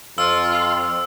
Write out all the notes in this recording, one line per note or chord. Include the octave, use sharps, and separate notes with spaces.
F2 F4 E6